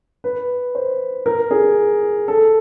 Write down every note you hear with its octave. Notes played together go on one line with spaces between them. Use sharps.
B4
C5
A#4
G#4
A4